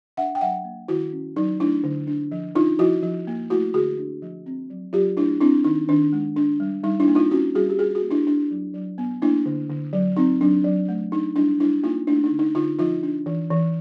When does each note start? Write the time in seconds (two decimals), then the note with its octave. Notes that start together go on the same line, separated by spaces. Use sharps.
0.17 D4 E5 F#5
0.35 G5
0.41 F#3 E5 F#5
0.65 A#3
0.88 D#3 E4 F#4
1.12 C#4
1.36 F#3 D#4
1.60 A3 D4 E4
1.84 D3
2.07 D4
2.32 F3
2.55 D4 D#4 F4
2.79 F3 E4 F#4
3.03 F3
3.27 A#3
3.50 A3 E4 F#4
3.74 D3 F#4 G#4
3.98 D4
4.22 F3
4.46 C4
4.70 F#3
4.93 F#3 F4 G4
5.17 A3 D4 E4
5.41 C4 D4 E4
5.64 D#3 D#4
5.89 D#3 D4
6.13 G#3
6.36 D4
6.60 G3
6.84 G3 D#4
7.00 D4 E4
7.07 A#3
7.15 D#4 F4
7.31 C#4 E4 F#4
7.55 G3 F#4 G#4
7.70 G4
7.79 G3 F#4 G#4
7.95 F#4 G#4
8.03 A#3
8.11 D4 E4
8.27 D4
8.51 F#3
8.74 F#3
8.98 B3
9.22 A#3 D4 E4
9.46 D3
9.69 D3
9.93 F#3
10.17 C4 D#4
10.41 F#3 D4
10.64 F#3
10.88 A3
11.12 D4 D#4
11.36 G3 D4 E4
11.60 G3 D4 E4
11.83 A#3 D#4 F4
12.07 A3 D4 E4
12.24 D#4
12.31 D3
12.39 D#4
12.55 D3 D#4 F4
12.79 F3 D#4 F4
13.03 D4
13.26 E3
13.51 E3